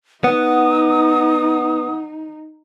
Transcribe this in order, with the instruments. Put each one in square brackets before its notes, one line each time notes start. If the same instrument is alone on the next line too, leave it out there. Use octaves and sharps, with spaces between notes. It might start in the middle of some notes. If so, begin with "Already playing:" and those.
[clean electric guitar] B3 [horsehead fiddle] D#4 [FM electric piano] F#5 [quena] D#6